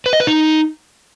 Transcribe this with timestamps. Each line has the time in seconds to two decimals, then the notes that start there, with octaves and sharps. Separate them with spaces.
0.06 B4
0.13 D#5
0.20 B4
0.27 D#4